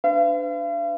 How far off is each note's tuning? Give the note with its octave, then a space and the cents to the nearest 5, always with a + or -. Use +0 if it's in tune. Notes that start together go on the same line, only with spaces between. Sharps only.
D4 +0 B4 +45 F5 -45